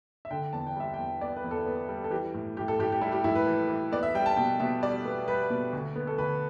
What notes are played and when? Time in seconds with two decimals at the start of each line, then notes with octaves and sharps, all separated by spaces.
0.25 E5
0.31 D3 G5
0.53 E2 A5
0.67 G5
0.76 G3 E5
0.94 G5
0.99 E2
1.21 B3 D5
1.37 B4
1.44 E2
1.51 A4
1.66 B3
1.89 G3
2.04 A4
2.11 E3 G4
2.34 A2
2.57 A2 G4
2.68 A4
2.79 A2 G4
2.92 G4
3.01 G3 E4
3.12 G4
3.24 A2 E4
3.35 B4
3.47 E3
3.70 E3
3.92 B3 D5
4.03 E5
4.15 G3 G5
4.26 A5
4.37 B2 G5
4.60 B2 E5
4.83 G3 D5
5.05 B3
5.28 G3 B4
5.50 B2
5.73 D2
5.96 B3
6.07 A4
6.18 D2 B4